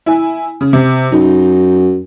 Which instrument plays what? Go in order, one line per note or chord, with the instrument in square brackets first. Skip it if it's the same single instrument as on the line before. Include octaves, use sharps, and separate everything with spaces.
[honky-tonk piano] E4 G#5
C#3
C3
[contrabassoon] F#2 [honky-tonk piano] D#4